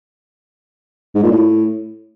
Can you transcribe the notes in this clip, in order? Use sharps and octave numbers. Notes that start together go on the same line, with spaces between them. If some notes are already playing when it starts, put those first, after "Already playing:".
G#2
A#2
A2